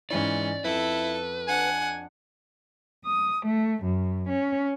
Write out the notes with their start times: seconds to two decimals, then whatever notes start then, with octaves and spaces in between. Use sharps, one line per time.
0.10 G#2 E3 C#4 E4 D5
0.64 F2 F3 E4 A4 B4
1.47 D4 F#5 G#5
3.05 D#6
3.45 A3
3.83 F#2
4.28 C#4